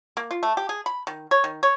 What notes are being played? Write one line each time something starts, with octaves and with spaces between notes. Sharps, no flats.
A#3
F4
A3
G4
G#4
B5
D#3
C#5
D#3
C#5